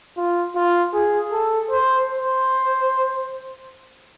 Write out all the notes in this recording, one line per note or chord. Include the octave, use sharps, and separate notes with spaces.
F4
F4
G#4
A4
C5
C5